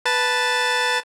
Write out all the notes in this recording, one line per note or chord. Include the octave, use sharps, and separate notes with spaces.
B4 A5 A6